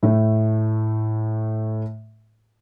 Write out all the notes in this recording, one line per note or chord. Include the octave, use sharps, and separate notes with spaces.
A2 A3